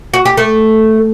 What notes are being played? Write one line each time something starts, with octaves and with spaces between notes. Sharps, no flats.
F#4
G4
A3